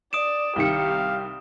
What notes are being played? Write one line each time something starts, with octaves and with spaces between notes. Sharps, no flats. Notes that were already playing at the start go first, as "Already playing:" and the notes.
D5 D#6 D7 E7
C2 D#3 G4 F5 C#7